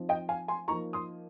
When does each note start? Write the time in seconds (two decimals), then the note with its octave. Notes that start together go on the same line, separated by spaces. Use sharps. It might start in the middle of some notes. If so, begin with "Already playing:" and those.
Already playing: F3 C4 D#4
0.09 D#5 G5
0.29 F5 G#5
0.48 G#5 C6
0.68 F3 A#3 D#4 A#5 C#6
0.93 C6 D#6